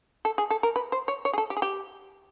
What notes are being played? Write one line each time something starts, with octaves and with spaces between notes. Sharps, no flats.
A4
G#4
A4
A#4
B4
C5
C#5
C#5
G#4
A4
G4
G#4
G4